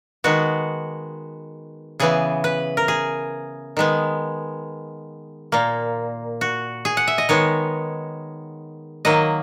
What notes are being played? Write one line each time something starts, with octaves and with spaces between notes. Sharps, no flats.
D#3 G#3 B3 F#4
C#3 E3 B3 G#4
B4
A#4
G#4
D#3 G#3 B3
A#2 A#3
F#4
G#4
F#5
E5
D#5
D#3 G#3 B3 C#5
D#3 F#3 A#3 D#5